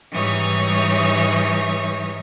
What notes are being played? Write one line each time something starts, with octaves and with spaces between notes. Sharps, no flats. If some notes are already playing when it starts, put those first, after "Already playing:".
G#2 E3 G3 D#4 C#5 D#6